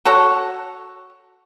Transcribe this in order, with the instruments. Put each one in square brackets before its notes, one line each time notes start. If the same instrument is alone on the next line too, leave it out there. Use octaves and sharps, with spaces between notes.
[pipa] F#4 A4 C#5 F#5